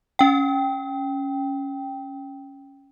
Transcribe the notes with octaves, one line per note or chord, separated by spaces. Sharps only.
C#4 G5